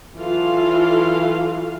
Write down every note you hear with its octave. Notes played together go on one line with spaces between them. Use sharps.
E3 F#3 F4 A4 F5